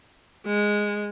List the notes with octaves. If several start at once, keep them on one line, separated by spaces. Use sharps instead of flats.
G#3